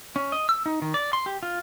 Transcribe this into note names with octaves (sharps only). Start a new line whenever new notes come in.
C#4
D#5
E6
D#4
D#3
D5
C6
G4
F4